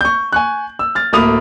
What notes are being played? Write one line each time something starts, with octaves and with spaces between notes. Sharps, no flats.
C#6 G6
G#5 C#6 F#6
E6
F6 A6
D1 A3 A#3 B5 D#6 F7